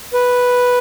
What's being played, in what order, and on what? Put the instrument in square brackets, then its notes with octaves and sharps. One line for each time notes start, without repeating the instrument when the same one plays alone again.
[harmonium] B4